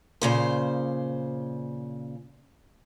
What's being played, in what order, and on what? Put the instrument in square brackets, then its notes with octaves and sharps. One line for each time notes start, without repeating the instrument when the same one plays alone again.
[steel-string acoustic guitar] A#2 C#3 C5